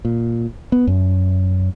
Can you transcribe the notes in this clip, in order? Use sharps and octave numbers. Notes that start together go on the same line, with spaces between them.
A#2
B3
F#2